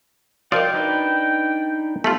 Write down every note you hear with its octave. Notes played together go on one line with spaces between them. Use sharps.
F3 F4 F#4 A#4 C5 D5 D#5 G5
D4 D#4 B4
A3 B3 F4 G4